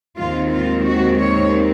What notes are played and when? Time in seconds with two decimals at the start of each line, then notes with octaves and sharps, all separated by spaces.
0.18 D#2 D#3 G#3 C4 F4
0.51 F4
0.86 F#4
1.18 C#5